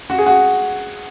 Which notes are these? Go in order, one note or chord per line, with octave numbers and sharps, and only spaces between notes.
F#4
G#4
F#4